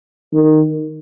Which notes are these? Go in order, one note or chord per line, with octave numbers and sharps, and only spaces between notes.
D#3